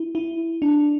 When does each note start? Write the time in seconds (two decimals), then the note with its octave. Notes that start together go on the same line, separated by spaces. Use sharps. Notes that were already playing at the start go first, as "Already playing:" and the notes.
Already playing: E4
0.15 E4
0.62 D4